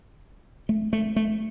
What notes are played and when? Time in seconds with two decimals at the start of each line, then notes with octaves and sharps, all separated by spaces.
0.69 A3
0.93 A3
1.16 A3